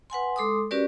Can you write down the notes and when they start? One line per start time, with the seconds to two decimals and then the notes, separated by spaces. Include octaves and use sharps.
0.10 B4 F#5 G#5 C6
0.36 G#3 A4 C6 D6 D#6
0.71 C#4 F#4 G4 A#4 B4 D5